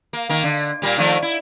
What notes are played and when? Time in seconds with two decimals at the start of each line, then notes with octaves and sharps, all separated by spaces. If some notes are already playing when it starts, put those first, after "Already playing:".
0.13 A#3
0.29 D#3 A#3
0.43 D3
0.82 A#2 G3 A#3
0.98 D#3 F3 A3
1.22 E4